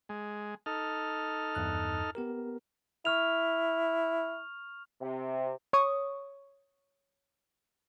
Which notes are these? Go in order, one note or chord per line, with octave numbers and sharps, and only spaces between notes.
G#3
D#4 A4 F6
E2 G2 F#6
B3 G4 A#4
E4 C#6 F6 F7
C3
C#5 C#6 D#6